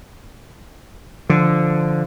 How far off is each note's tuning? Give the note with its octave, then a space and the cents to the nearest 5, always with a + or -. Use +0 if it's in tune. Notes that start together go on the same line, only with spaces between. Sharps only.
D3 +0 F3 -10